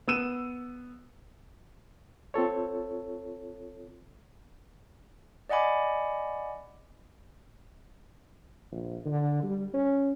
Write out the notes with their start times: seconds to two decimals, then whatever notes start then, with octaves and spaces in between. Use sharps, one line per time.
0.08 B3 E6 D#7 E7
2.34 C4 F4 A4 C#5
5.49 D5 D#5 F#5 G#5 B5 D6
8.71 A#1
9.05 D3
9.43 G3
9.73 C#4